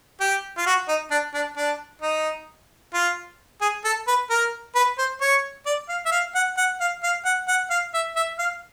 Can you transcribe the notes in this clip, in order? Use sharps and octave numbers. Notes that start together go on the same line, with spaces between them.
G4
F4
F#4
D#4
D4
D4
D4
D#4
F4
G#4
A4
B4
A#4
B4
C5
C#5
D5
F5
E5
F5
F#5
F#5
F5
F5
F#5
F#5
F5
E5
E5
F5